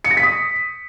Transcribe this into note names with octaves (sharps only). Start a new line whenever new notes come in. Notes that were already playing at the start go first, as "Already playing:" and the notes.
C#7
A#6
B6
D#6